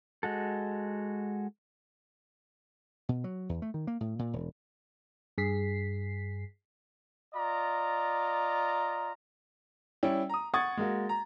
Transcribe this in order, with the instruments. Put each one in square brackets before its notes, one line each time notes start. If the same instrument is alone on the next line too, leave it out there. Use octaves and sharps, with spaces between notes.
[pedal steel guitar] G#3 F#4 A4
[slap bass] B2
F#3
E2
A3
D#3
A#3
A2
A#2
E1
[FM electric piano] G2 G#4 B6 C7
[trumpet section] F4 D5 D#5 A#5
[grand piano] G3 C#4 E4 G5
A#5 D#6
F#5 C#6 D#6 G#6 A6
G#3 A#3 F#4
A#5